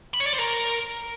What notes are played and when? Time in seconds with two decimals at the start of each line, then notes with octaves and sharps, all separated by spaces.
0.14 B5
0.20 C#5
0.27 D5
0.33 C5
0.39 A#4